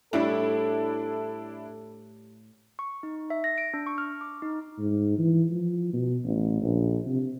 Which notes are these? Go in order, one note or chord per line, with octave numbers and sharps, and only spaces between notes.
A2 G3 D4 E4 A4
C#6
D#4
E5
A#6
D7
D4
C#6
F6
D6
D#4
G#2
E3
F3
B2
A1
A#1
C3